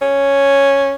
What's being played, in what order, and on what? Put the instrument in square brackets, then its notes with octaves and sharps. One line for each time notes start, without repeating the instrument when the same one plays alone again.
[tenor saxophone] C#4